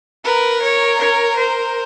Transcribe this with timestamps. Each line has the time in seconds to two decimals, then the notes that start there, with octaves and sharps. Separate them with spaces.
0.24 A#4 B4
0.62 C#5
0.98 C#5
1.37 C5